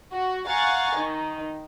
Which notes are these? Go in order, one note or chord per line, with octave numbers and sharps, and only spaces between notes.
F#4
F5 F#5 G#5 A#5 C#6 A6
D#3 D#4